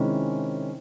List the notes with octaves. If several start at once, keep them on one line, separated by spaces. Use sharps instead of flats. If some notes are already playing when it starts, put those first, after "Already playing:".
Already playing: C3 D#3 G#3 C#4 E4